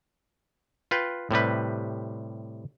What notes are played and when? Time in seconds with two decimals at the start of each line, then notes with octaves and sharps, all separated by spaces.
0.91 F4 B4 G5
1.31 A2 C3 G3 B4